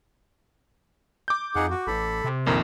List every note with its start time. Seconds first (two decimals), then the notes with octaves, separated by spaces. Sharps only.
1.28 D6 G6
1.56 F2 D#4 G#4 F#5
1.70 F#4
1.87 A1 A4 B5
2.24 C3
2.46 A#1 F2 D#3 A#4